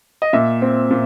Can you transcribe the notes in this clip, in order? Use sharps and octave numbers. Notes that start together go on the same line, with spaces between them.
D#5
A#2 E5
C4
A#2